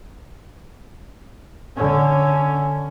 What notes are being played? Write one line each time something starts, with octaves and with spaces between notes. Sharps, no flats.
D3 C#4